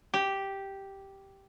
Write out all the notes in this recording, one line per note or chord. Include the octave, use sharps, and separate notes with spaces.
G4